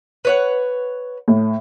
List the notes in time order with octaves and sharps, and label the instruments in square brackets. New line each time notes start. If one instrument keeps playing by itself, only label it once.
[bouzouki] B4 C#5 F#5
[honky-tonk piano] A2